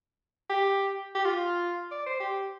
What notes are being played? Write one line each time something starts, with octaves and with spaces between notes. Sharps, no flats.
G4
G4
F4
D5
C5
G4